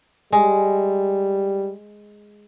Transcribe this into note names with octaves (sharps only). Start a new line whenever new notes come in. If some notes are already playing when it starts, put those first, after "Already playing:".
G3 G#3